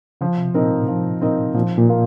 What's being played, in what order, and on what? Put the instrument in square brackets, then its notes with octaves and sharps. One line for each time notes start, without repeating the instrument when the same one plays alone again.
[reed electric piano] C#3 [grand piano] F3
[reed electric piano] C3
[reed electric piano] A#2 [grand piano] C4 D#4 A#4 D#5
[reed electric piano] A2
[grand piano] F3
C4 D#4 A#4 D#5
[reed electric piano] A#2 [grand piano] F3
[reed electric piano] A#2
[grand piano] A#3 F4